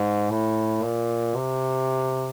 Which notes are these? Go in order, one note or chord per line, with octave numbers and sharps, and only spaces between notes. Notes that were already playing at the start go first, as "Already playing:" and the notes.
Already playing: G#2
A2
A#2
C3